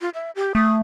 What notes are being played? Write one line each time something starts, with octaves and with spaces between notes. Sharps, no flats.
F4
E5
G4
A3 D#6